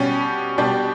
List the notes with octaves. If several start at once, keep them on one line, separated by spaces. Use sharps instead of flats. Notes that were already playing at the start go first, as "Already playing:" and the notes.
Already playing: B2 G3 C#4 G4
B2 G3 D4 G4